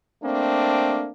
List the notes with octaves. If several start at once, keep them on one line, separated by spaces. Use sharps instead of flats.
A3 A#3 C4 D4